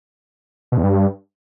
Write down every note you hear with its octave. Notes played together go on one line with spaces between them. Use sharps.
B2
E2
G2